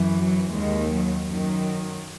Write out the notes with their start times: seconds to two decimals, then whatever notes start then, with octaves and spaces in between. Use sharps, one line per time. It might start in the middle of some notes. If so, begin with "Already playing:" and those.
Already playing: F#2 E3
0.14 F#3
0.51 D#2 D#3 G#3
0.89 F#3
1.26 F#2 D#3 F#3